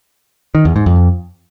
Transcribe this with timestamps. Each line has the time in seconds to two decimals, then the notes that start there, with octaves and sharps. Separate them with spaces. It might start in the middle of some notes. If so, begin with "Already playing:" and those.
0.55 D#3
0.65 E2
0.76 G#2
0.86 F2